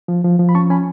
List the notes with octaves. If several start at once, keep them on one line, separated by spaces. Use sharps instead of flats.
F3
F3
F3
B5
C#4 A5 C#6
C#4 G#5 B5